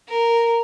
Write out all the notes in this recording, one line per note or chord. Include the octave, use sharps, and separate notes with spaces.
A#4